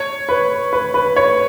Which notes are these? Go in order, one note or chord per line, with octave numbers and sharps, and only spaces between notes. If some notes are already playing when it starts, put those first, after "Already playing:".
Already playing: C#5
B4
B4
B4
C#5